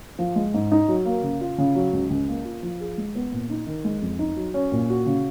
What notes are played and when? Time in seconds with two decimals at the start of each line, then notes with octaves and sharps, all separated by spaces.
0.19 F3
0.36 G#3
0.54 G#2
0.72 D#4
0.88 F#3
1.05 A#3
1.23 C#3
1.41 F4
1.58 C#3
1.75 F#3
1.93 C#2
2.10 C#2
2.28 A#3
2.45 F4
2.63 F3
2.80 G#4
2.98 G#3
3.15 B3
3.32 A#2
3.50 D#4
3.67 D#3
3.84 G#3
4.02 F2
4.19 D#4
4.36 F#3
4.54 C#4
4.72 A#2
4.89 F#4
5.06 C#3